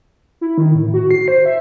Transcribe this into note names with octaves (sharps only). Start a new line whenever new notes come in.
E4
D#3
A2
F#4
C7
C5
E5